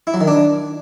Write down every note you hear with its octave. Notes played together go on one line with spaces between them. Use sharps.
E4
F#3
D#3
D4